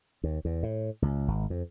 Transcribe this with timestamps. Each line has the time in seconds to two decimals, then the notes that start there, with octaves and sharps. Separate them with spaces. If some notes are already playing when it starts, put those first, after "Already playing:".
0.24 D#2
0.45 E2
0.63 A2
1.02 C#2
1.28 G#1
1.50 F2